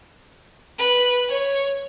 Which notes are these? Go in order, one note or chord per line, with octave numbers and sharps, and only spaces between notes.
B4
C#5